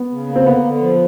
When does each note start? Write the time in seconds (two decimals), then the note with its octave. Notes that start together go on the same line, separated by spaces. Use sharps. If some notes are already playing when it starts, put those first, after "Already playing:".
Already playing: B3
0.11 C#3
0.28 A#3
0.36 C4
0.46 D3 B3
0.63 D3
0.81 F3